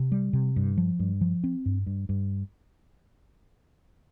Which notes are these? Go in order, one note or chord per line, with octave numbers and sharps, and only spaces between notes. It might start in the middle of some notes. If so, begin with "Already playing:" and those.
Already playing: C3
G3
C3
G2
F3
G2
F3
C4
G2
G2
G2